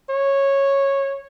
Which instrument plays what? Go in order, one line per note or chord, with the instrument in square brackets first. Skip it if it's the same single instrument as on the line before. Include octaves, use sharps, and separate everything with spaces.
[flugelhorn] C#5